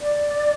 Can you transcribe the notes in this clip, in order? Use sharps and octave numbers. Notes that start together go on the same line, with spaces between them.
D5